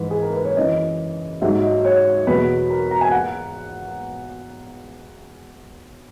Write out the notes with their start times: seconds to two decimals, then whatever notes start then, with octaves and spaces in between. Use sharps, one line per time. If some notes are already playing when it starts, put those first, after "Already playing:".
Already playing: G#2 E3 B4
0.11 G#4
0.22 A#4
0.33 B4
0.45 C#5
0.56 F#2 E3 D#5
1.41 G#2 F#3 E5
1.63 D#5
1.85 C#5
2.27 E2 B2 F#3 B4
2.70 A#4
2.91 A#5
3.01 G#5
3.12 F#5